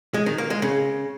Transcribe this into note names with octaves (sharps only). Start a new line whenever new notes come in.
G#3
D#3
A#3
G#3
C#3